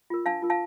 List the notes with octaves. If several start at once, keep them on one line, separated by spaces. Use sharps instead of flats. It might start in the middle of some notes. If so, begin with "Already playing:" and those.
F4 A#4
D4 F5 A5
F4 A#4
F5 A5